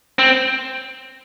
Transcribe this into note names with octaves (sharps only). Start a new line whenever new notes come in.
C4